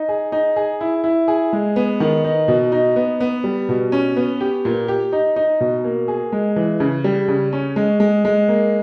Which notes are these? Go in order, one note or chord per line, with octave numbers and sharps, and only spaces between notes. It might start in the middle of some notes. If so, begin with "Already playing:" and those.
Already playing: D#4
G#4
D#4
G#4
E4
E4
G#4
G#3
B3
D#3
D#4
B2
D#4
B3
B3
G3
B2
C#4
B3
G4
A#2
G4
D#4
D#4
B2
A#3
G#4
G#3
E3
C#3
G3
C#3
C#4
G#3
G#3
G#3
A#3